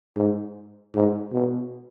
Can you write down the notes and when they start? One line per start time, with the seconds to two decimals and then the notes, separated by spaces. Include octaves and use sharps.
0.17 G#2
0.95 G#2
1.33 B2